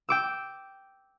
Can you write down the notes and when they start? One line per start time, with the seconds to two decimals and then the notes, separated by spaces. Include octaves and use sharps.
0.09 G5 D6 E6